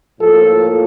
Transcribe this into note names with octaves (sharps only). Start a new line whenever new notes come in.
A2 F3 A#3 A4